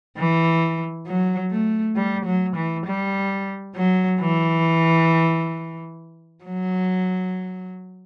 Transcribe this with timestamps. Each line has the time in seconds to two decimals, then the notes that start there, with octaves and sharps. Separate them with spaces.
0.17 E3
1.06 F#3
1.51 A3
1.96 G3
2.25 F#3
2.56 E3
2.86 G3
3.76 F#3
4.20 E3
6.44 F#3